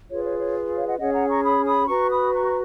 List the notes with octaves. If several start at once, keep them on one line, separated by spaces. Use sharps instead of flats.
F4 G#4 B4 C#5
C#5
C#5
C#5 F5
D#5 F#5
C#4 G#4 C#5 D#5 F#5
F#5 A#5
A#5 C#6
B5 D#6
B5 D#6
F#4 B4 A#5 C#6
B5 D#6
A#5 C#6